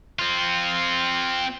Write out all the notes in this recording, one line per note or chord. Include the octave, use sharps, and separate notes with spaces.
C4 F4